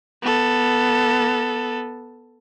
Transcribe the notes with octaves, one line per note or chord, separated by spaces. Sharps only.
B3 A4